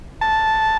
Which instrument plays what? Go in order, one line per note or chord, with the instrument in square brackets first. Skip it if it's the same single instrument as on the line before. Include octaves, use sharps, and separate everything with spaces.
[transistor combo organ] A5